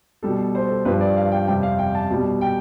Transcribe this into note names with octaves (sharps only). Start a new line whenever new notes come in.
B2 G3 A4
C5
A4
G2 F3 B4
D5
F5
G5
F2 C3 G3 G5
F5
G5
A5
B2 G3
G5